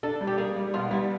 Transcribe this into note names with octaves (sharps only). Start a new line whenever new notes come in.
D4 A4
G3
G4
A#3 G#4
G3
B2 F4
G3 E4